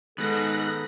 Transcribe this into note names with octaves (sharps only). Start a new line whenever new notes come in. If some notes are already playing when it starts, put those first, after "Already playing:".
G#2 D#3 B3 A4 B5 F#6 A#6